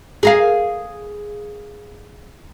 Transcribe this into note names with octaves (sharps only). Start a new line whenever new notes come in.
G#4 A#4 F5